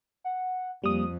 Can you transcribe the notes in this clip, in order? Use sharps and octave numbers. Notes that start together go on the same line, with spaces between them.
F#5
F2 G3 A#3 D#6